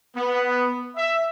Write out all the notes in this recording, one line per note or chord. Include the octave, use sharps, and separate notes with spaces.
B3
E5